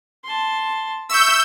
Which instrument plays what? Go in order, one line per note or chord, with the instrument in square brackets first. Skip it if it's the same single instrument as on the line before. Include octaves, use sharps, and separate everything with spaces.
[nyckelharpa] A5 C6
[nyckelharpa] E5 C#6 [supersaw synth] E6 G6